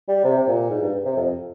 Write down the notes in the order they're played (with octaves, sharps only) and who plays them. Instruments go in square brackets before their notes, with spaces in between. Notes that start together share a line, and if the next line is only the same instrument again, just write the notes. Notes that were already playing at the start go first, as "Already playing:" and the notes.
[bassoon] G3
C3
C3
A#2
G#2
G2
C3
F2